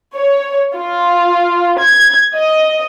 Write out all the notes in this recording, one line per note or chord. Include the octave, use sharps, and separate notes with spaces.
C#5
F4
G#6
D#5